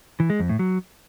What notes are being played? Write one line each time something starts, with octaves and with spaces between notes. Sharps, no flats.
E3
G#3
F2
A2
F#3